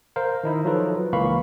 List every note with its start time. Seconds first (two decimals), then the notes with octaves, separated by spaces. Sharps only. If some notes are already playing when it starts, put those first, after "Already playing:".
0.16 A#4 C5 F5
0.44 D#3 D#4 E4
0.65 F3 F#3 D#4 F4 A4 B4
1.13 C#2 E3 A#3 F5 B5 C#6